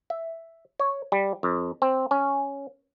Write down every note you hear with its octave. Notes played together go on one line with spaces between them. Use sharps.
E5
C#5
G3
F2
C4
C#4